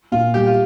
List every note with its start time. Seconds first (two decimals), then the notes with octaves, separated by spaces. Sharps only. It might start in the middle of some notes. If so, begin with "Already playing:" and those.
0.12 A#2 F4
0.34 G3 G4
0.47 F4